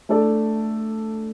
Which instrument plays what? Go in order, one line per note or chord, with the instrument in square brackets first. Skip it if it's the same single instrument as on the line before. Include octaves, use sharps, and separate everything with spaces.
[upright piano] A3 D4 A4 D5